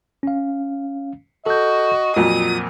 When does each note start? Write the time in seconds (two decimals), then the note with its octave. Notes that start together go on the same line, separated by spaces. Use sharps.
0.23 C#4 F5
1.46 F#4 A4 D#5 G6
2.16 F2 A#2 F#3 F4 D#6